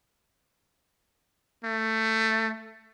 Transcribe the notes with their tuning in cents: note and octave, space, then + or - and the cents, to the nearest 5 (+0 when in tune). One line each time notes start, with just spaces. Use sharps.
A3 +15